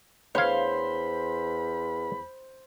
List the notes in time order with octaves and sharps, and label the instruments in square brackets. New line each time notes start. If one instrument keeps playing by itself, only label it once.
[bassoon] E2 [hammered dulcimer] C5 C6 [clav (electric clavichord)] C#5 F5 [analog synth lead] B5